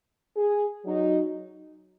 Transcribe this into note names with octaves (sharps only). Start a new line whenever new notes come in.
G#4
F#3 D#4